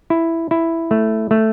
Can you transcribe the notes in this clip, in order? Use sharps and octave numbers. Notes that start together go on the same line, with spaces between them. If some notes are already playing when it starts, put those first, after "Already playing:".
E4
E4
A3
A3